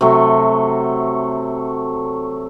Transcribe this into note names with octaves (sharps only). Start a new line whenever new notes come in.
C3 F#3 A3